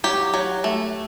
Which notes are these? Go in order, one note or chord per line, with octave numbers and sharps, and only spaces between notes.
F#3 G4
F#3
A3